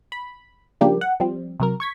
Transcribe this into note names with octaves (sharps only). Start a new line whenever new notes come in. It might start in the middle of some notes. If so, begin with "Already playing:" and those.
B5
C#3 F3 G3 A#3 D4 G4
F#5
F3 G3 C4
C3 F#3 A#4
C#6 G#6 B6